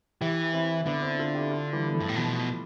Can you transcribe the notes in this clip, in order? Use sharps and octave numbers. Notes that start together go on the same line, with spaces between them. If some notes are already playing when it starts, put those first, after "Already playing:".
E3 E4 G4
C4 E4
D3 B3 D4
C4 E4
F4 A4
E4 G4
D4 F4
E3 G3
B3
F3 A3
G2
A2
B2 F3